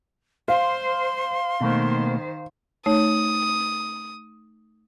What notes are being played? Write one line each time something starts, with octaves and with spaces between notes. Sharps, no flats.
C5 F5 C6
B2 D#3 A3 A#3 C5
A3 D#4 C#5 D#6